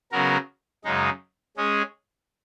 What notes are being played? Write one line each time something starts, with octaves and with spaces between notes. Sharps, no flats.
C#3 F#3 B3 F#4 A#4
F#2 C#3 G#3 D#4
G#3 C#4 G#4